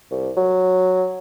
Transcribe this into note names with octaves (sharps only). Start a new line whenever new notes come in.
C2
F#3